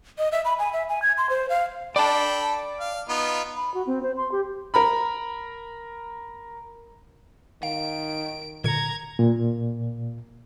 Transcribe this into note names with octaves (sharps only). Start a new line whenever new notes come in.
D#5
E5
B5
G#5
E5
G#5
G#6
C6
C5
F5
A4 D5 G5 A5 B5
F5
B3 D#4 F4
B5
F#4
C4
C5
C6
G4
A#4 A#5 B5
D#3 F5 D7
A#2 D3 A#5 G#6 C#7
A#2